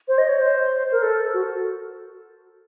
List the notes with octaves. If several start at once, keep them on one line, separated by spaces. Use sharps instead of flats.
C5
D#5
C#5
C5
A#4
A4
F#4